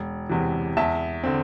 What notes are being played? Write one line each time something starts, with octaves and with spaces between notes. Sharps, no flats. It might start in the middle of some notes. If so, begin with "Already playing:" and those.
Already playing: E1
E2 C3 E3
E2 E5 A5
D3 C4